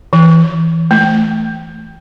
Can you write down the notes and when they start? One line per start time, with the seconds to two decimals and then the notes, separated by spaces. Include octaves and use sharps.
0.13 E3
0.91 A3